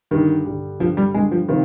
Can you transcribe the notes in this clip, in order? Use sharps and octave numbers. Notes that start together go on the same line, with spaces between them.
G2 D3 D#3 G3
G2 D3 G3
G2 D3 F3 G3
G3
G2 D3 G3 G#3
F3
C3 D#3 F3 C4 F4